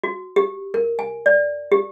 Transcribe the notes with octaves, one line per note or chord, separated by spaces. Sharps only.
F#4
G4
A#4
G#5
D5
G4